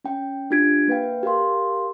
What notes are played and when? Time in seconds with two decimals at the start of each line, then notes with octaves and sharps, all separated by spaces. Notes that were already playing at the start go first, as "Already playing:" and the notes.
0.04 C#4 G5
0.51 D4 F4 G4 G#6 B6 D7
0.88 A#3 B4 F5 G5
1.23 G4 A#4 F5 C6